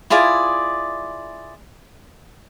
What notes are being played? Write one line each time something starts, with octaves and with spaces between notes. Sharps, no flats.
E4 F4 G#4 D5